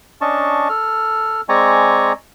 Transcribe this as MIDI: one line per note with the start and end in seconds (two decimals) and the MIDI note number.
0.21 0.68 61
0.21 0.68 62
0.21 0.68 75
0.21 0.68 81
0.21 0.68 85
0.69 1.41 69
0.69 1.41 89
1.49 2.12 56
1.49 2.12 60
1.49 2.12 74
1.49 2.12 80
1.49 2.12 82
1.49 2.12 85